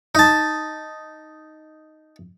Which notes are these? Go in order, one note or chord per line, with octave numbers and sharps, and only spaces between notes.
D#4 A5